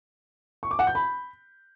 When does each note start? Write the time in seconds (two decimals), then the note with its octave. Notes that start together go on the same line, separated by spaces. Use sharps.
0.63 C#6
0.71 D6
0.79 F#5
0.87 G6
0.95 B5